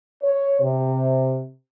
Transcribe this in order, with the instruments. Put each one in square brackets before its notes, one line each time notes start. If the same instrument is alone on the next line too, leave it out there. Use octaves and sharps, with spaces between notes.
[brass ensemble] C#5
C3